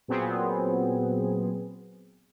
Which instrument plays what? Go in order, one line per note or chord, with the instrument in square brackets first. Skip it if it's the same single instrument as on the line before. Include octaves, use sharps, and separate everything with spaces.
[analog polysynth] A#2 F#3 B3 C4 G#4